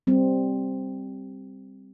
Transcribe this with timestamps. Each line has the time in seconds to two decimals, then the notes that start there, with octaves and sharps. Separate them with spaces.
0.07 G3 C4